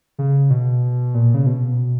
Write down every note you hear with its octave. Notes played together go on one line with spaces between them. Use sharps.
C#3
B2
A#2
C#3
B2